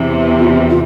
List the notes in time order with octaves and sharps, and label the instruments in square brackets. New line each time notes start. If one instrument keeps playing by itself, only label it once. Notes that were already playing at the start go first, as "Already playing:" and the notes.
Already playing: [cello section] E2 C3 E3
[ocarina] F4
F4